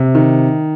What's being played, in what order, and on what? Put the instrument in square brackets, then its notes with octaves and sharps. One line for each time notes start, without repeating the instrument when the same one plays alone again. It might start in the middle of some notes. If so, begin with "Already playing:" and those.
Already playing: [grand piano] C3
D#3